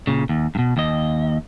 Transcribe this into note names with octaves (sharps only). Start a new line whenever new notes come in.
A#2 C#3
D#2
G2 B2
D#2 D#5